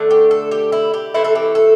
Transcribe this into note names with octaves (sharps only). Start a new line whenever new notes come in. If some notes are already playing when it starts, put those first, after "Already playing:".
Already playing: D3 A3 D4
G4
A4
G4
E4
G4
E3 A3 C4 E4
A4
G4
A4